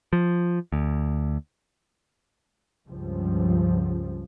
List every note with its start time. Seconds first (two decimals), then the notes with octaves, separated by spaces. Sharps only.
0.13 F3
0.72 D2
2.88 C#2 G2 F3